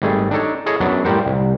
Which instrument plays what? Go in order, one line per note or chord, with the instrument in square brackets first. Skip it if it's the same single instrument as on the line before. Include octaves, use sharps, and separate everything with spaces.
[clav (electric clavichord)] G#1 G3 A3 G#4
D4 D#4 A4 C#5
E4 G#4 A4 C#5 D#5
F#2 F#3 B3 D4
A2 G3 G4 A#4 C5 F#5
C2